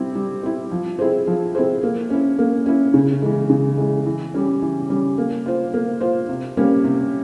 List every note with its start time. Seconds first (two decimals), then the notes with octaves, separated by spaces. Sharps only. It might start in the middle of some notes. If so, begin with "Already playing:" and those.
Already playing: G3 C4 E4
0.15 G3
0.43 C4 E4
0.71 F3
0.99 C4 E4 G#4 C5
1.27 F3
1.55 C4 E4 G#4 C5
1.83 A#3
2.10 C#4 E4
2.39 A#3
2.66 C#4 E4
2.94 C#3
3.22 E3 G#3
3.50 C#3
3.78 E3 G#3
4.06 E3
4.34 G3 C#4
4.62 E3
4.90 G3 C#4
5.18 A#3
5.46 F4 C5
5.74 A#3
6.00 F4 C5
6.29 C3
6.57 G3 A#3 C#4
6.84 C3